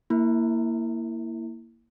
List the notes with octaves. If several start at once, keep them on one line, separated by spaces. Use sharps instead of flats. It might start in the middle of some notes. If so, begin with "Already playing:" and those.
A#3 E4